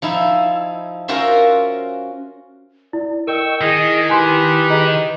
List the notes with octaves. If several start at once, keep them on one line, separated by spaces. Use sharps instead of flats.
F3 D#4 E4
C#4 F4 F#4 A#4 C5 E5
E4 D5
A#4 D#5 G5 C#6 E6
D#3 E4 G#4 D#5
G4 B4 G#5 C6
G#4 D#5 A#5